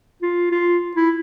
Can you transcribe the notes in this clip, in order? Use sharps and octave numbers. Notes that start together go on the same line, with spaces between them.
F4
F4
E4